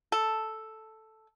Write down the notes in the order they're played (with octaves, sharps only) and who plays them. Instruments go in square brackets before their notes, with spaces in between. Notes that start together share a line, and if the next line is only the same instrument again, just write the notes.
[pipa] A4